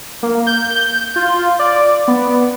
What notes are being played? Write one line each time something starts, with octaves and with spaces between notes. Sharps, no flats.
A#3
G6
F4
D5
B3